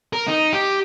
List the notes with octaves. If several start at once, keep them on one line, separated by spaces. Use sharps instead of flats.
A#4
D#4
G4